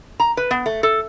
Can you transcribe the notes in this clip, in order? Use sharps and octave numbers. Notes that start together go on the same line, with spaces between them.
A#5
B4
B3
A3
A4